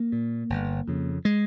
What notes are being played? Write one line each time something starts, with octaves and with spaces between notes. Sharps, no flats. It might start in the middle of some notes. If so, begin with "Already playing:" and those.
Already playing: A#3
A#2
G1
F2 C#3
G#3